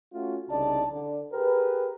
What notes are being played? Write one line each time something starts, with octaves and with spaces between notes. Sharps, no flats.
A3 C#4 F4 F#4
C2 C#3 D4 D#4 D5 A5
D3
G4 G#4 A#4 B4